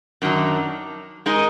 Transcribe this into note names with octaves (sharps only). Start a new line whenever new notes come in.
F#2 D#3 F#3 D4
G#3 D#4 A#4 D#5